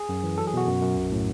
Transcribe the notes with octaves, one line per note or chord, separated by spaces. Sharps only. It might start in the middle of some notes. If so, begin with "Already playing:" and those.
Already playing: G#4
F#2
E3
F#3 A4
G#4
B2 F#4
F#2
F#2
B1
A2